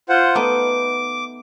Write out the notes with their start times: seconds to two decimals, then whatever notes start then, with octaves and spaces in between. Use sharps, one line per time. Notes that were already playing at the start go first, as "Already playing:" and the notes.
0.09 F4 C5 F#5
0.35 A3 B3 D#4 D6